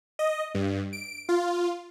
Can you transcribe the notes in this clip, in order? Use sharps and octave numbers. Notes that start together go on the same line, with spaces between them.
D#5
G2
D7
F4